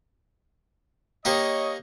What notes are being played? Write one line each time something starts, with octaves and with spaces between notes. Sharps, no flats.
A#3 D#4 G4 C#5 D#5